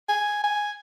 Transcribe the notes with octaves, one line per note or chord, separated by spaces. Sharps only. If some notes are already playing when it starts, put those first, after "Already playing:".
G#5
G#5